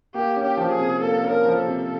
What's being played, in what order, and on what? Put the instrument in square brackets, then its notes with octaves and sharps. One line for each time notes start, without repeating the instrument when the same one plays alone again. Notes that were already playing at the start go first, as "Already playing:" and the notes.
[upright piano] A#3 [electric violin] G4
[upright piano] C#4
[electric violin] G4
[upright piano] F3
[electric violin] G#4
[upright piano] C3
[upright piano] A#3 [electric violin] A4
[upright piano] C#4
[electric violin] A#4
[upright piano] F3
[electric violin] A4
[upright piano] C3